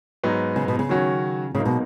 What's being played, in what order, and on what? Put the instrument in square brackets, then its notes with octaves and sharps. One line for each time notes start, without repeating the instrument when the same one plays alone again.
[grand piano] G#2 F#3 B3 D#4
[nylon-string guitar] C#3
B2
C#3
[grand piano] D#3 F#3 C#4 F#4
[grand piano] G#2 F#3 A#3 D#4 [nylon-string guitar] C#3
[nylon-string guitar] B2